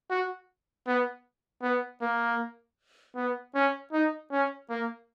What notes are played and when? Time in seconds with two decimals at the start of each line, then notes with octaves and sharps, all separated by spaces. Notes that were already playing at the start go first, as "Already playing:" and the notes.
0.10 F#4
0.87 B3
1.63 B3
2.02 A#3
3.16 B3
3.55 C#4
3.93 D#4
4.31 C#4
4.70 A#3